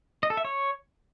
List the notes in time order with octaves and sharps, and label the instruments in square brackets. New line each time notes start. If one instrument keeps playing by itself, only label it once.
[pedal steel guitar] D#5
A4
E5
C#5